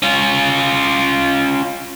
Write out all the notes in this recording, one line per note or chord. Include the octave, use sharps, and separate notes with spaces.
C#4 F4